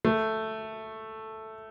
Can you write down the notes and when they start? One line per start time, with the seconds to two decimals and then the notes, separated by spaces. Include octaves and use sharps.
0.05 A3